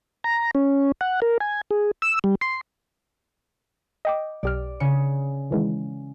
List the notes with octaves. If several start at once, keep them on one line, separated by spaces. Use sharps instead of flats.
A#5
C#4
F#5
A#4
G#5
G#4
E6
G3
C6
D#5 G5 D6
B1 G4 D5 F6
C#3 C#7
D#3 E3 G#3